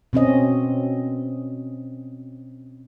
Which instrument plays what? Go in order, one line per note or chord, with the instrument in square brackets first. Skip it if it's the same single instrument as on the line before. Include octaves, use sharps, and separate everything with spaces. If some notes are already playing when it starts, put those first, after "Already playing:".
[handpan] B2 C4 C#4 D#5